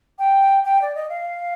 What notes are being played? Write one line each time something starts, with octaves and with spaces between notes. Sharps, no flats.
G5
G5
D5
D#5
F5